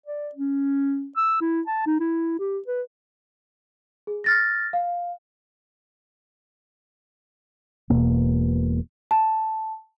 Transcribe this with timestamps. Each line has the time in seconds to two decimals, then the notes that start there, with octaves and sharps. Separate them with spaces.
0.06 D5
0.35 C#4
1.17 E6
1.41 E4
1.67 A5
1.86 D#4
2.00 E4
2.40 G4
2.67 B4
4.07 G#4
4.24 F6 A6 A#6
4.73 F5
7.90 E1 E2 B2 A#3
9.11 A5